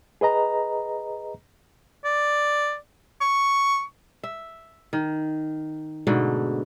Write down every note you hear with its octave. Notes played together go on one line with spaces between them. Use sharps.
G#4 B4 D#5 A#5
D5
C#6
E5
D#3
G#2 B2 D3 A3